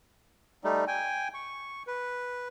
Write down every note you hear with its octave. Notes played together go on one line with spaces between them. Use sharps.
G3 A3 D#4
G5 G#5
C#6
B4